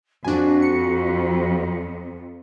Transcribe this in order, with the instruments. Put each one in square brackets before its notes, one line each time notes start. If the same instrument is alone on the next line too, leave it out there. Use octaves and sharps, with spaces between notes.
[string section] F2 [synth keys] D4 G#5 [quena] F#4
[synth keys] C#7